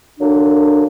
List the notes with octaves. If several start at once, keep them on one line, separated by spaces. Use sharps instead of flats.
F#2 D3 F#3 A#3 D4